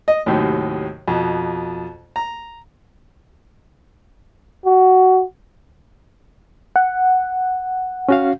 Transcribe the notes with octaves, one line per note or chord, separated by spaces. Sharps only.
D#5
D#2 A2 C3 D#3 F#3
F2 B2
A#5
F#4
F#5
C#4 F#4 F5